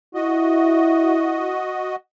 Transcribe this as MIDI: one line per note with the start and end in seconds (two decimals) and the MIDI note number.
0.15 1.62 64
0.15 1.96 66
0.15 1.96 75